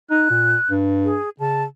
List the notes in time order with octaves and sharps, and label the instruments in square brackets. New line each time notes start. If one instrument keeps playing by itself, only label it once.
[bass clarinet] D#4 [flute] F#6
[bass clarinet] A#2
G2
[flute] G#4
[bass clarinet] C#3 [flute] A5